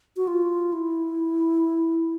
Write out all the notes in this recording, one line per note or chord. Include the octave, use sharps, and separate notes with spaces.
F#4
F4
E4